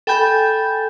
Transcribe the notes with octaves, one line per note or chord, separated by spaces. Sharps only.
A4 G5 G#5 B5 G6 A6